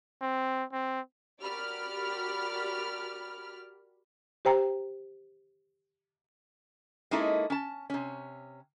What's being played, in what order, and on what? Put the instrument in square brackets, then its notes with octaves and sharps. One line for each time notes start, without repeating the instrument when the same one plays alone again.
[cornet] C4
C4
[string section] F#4 G4 A#4 D5 B5 F6
[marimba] G4 C5 G5 A#5
[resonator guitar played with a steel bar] G#3 A#3 C#4 D#4 E4 A4
C#4 A5
C3 C#4